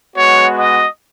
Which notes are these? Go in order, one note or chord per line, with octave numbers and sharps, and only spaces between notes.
G#3 B3 F#4 C#5
D#5